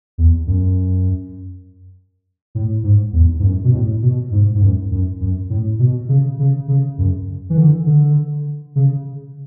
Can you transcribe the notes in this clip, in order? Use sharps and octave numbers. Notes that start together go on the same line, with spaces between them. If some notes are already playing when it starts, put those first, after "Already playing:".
E2
F#2
A2
G#2
E2
G#2
F#2
B2
A2
B2
G#2
G#2
F#2
F#2
F#2
A2
B2
C#3
C#3
C#3
F#2
E3
D3
D3
C#3